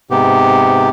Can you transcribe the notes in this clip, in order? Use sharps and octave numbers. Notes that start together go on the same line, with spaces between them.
G#2 C3 B3 G4